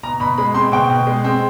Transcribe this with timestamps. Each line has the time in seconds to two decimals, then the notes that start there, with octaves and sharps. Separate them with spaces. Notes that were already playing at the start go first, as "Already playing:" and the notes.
0.03 B2 A#5
0.20 B2 B5
0.38 G#3 B5
0.54 C4 C6
0.72 B2 G5
0.90 B2
1.07 G#3
1.24 C4